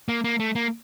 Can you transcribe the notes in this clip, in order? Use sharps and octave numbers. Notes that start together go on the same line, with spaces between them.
A#3
A#3
A3
A#3